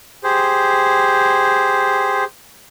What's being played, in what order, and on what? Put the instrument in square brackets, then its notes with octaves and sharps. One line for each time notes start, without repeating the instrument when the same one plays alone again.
[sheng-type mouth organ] G4 G#4 C5